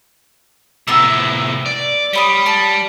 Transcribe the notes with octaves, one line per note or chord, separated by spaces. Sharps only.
A2 C3 B3 A#5 E6
D5
G3 C#5 B5 D#6
A5